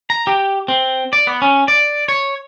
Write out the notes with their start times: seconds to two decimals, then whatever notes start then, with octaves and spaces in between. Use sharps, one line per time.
0.10 A#5
0.27 G4
0.68 C4
1.13 D5
1.27 B3
1.42 C#4
1.68 D5
2.09 C#5